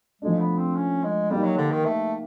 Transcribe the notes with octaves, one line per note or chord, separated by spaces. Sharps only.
F3 G#3 A3 D4
B3
C4
C#4
G#3
G3 A#3 D#4 G4
F#3
D3
D#3
A3